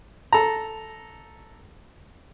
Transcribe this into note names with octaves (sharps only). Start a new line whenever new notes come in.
A4 A#5